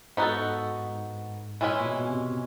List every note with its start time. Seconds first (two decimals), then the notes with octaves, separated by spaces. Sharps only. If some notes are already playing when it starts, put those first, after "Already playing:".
0.17 G#2 B3 D#4 F#4 A4
0.89 G#2
1.61 A#2 E3 G#3 C#4 E4
1.80 A#2
1.86 B2
2.01 B2
2.09 C3